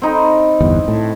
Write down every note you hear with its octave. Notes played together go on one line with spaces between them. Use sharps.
C4 D#4 B5
G1 E2
A2 A5